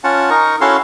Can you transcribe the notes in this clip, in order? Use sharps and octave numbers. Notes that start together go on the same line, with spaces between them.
C#4 F4 F#5 A5
D#4 A#4 C#6
C#4 E4 F#4 A4 F5 C6